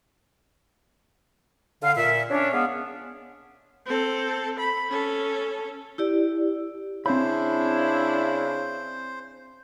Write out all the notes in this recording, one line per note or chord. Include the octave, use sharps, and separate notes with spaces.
D3 F5
A#2 E5
C#4 D4
G#3 B3 F5
C4 A4
B5
C#4 A4
E4 G4 D5
C#3 C4 D4 E4 C5 B5